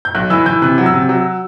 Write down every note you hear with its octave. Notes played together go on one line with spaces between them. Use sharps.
G6
B1 F#6
E3 E6
E3 G6
C3 F#6
F#3
E6
C3
F#3